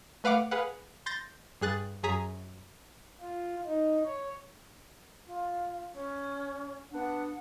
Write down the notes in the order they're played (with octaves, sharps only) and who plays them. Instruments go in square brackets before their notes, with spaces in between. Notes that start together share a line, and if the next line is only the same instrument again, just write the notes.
[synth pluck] A3 B4 F5 F#5 D6
G#4 B4 F5 F#5
C6 G6 A6 A#6
G2 G#4 F#6 A6
F#2 G#4 A#5 B6
[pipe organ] F4
D#4
C#5
[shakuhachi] F4
C#4
[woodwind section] B3 D4 [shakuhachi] F#5